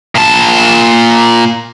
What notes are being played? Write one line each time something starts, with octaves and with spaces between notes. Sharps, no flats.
A#2 A5